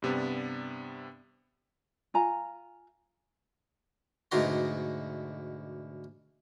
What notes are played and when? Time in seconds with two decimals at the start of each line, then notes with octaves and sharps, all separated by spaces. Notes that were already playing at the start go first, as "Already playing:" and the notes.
0.02 G2 C3 B3 D4
2.14 F4 G#5 A#5
4.31 D2 G#2 B2 D3 A#5 C6